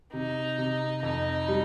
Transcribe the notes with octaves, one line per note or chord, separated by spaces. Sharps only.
C3 D#4
C3
F2 D#4
G3